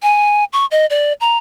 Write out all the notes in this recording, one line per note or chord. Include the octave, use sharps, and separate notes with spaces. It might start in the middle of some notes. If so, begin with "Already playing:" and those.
G#5
C#6
D#5
D5
A#5